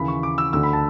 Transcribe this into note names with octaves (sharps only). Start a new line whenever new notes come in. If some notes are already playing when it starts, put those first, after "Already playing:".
Already playing: D#2 C#3 E3 B5
C#6
D6
E6
D2 D3 E6
B5
A5